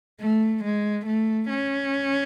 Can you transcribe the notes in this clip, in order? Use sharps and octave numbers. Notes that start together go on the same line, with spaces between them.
A3
G#3
A3
C#4